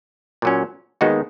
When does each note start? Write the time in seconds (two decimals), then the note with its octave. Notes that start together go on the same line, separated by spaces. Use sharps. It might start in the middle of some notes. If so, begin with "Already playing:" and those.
0.42 A#2 F#3 C#4
1.01 D#2 D#3 G#3 B3 D#4 F#4